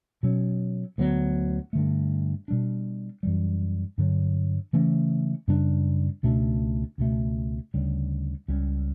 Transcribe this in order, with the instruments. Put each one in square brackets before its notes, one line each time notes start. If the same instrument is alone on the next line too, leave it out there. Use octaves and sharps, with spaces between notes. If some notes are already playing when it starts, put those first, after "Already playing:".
[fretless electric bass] B2 F#3 C#4
D2 D3 F#3 B3
G2 D3 A3
B2 G3 D4
F#2 E3 G3
G2 D3 F#3
C#3 E3 A3 C#4
F#2 C#3 G3 D4
C#2 B2 A3 D4
C#2 B2 A3
D2 C#3 G3
C#2 C#3 G3 C#4